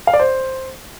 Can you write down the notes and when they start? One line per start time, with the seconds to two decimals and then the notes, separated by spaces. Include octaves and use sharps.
0.07 F5
0.13 D5
0.20 C5